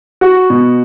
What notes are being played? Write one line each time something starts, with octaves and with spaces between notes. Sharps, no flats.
F#4
B2